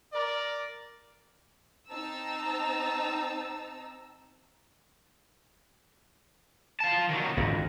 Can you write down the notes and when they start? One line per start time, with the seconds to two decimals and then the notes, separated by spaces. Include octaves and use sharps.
0.13 A#4 D5
1.90 C4 D#4 A5 A#5 E6
6.80 F4 A5
7.09 D#3 F#3
7.37 G#1 F2 G#2 D3